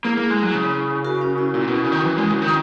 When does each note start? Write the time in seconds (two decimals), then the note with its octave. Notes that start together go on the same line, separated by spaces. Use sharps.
0.04 A#3 E4 G#4
0.17 A#3
0.30 G#3
0.42 F#3
0.54 C#3
1.05 F#4 A#4
1.21 C#4
1.38 E4
1.54 A#2 E4
1.67 B2
1.84 C#3
1.92 D#3
2.05 E3
2.17 G#3
2.29 C#3
2.42 D#3